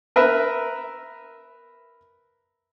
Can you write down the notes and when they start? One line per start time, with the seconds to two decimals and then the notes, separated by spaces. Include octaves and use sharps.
0.16 A#4 B4 E5